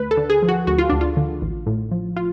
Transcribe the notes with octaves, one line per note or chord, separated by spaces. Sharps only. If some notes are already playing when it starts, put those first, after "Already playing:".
Already playing: D2 B4
A4
D3
G#4
F3
F#4
D2 F#4
F4
D2 D4
F4
D3
A1
A2
F3
F4